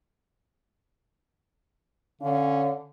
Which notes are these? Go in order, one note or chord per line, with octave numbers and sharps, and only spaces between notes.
D3 C#4 F5